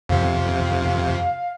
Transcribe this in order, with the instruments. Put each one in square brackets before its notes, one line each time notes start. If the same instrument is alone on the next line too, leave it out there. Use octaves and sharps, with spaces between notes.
[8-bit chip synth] F2 C3 [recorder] F5